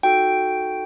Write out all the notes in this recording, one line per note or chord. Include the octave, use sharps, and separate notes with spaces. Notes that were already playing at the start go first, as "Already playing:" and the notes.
D#4 F#4 A4 G5